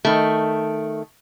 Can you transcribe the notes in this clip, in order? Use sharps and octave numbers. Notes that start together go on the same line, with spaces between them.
D#3 A3